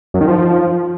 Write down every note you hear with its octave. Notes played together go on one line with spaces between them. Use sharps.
F#2
D#3
F3